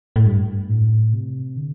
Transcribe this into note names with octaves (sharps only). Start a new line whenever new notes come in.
A2
G2
A2
C3
D3